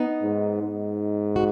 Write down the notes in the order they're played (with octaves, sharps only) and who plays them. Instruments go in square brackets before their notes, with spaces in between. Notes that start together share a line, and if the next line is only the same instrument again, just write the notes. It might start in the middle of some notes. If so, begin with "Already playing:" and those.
Already playing: [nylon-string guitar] B3 D#4
[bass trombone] G#2
G#2
[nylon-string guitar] F#4